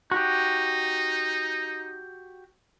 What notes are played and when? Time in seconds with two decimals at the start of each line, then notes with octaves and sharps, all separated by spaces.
0.11 D#4 F#4 G4